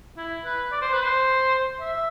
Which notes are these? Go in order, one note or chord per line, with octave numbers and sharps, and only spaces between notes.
E4
B4
D5
C5
B4
C5
E5